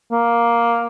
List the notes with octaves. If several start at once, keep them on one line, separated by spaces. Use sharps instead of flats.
A#3